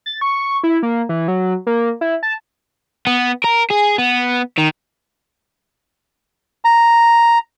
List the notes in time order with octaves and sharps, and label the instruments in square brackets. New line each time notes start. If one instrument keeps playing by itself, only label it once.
[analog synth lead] A6
C#6
E4
A#3
E3
F#3
A#3
E4
A5
[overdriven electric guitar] B3
A#4
G#4
B3
D#3
[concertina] A#5